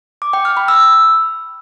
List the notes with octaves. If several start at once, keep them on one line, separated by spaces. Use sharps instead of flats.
D6
G5
F6
B5
E6